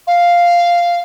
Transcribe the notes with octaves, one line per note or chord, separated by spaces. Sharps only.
F5